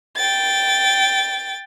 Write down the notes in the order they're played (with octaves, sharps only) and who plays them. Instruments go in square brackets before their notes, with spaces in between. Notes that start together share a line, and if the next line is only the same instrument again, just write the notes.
[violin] G5 A6